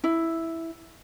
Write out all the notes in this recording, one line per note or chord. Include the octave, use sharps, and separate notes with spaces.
E4